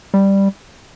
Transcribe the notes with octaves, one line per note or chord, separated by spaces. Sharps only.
G3